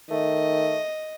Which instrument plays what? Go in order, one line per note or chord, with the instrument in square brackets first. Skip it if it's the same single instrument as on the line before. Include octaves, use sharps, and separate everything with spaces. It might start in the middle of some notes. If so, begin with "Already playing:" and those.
[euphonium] D#3 [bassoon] A3 [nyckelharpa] D#5